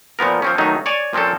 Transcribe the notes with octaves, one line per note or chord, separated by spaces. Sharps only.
A#2 F3 B3 A#4
F3 C4 C#4
D#3 F#3 A3 D#4
C#5 D5 G#5
A#2 F3 C4 C#4 A4